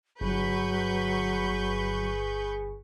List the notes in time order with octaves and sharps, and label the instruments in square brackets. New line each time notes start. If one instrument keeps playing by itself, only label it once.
[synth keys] G1 [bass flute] F#3 [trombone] G#4 [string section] B4 C#6 G6